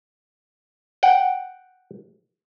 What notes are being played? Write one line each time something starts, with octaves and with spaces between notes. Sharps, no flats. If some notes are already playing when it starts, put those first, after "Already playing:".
F#5 G5